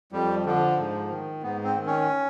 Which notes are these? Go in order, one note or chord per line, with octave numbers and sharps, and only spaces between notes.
F2 G3
D3 F3
G#2
D#3
G#2 B3
C4
D#3
C#4